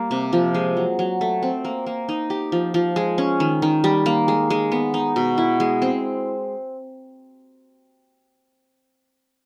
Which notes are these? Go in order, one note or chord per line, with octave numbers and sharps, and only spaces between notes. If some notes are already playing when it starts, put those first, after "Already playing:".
Already playing: G3 A#3
C3
F3
G#3
F#3
F#3
A3
C4
A#3
A#3
D#4
G4
F3
F3
G#3
C#4
D#3
D#3
G3
A#3
G#3
G#3
B3
D#4
B2
E4
G#3
C4